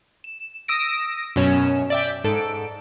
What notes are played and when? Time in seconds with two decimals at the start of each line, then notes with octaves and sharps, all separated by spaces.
0.24 E7
0.68 D#6 E6 A#6 D7
1.36 F#2 B2 C#4 E7
1.90 D5 E5 G5
2.24 G#2 A4 D7